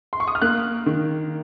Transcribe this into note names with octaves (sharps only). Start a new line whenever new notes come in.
C6
C#6
D#6
F6
A#3 F#6
D#3